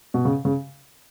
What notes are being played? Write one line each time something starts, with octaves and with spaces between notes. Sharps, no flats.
B2
C#3
C#3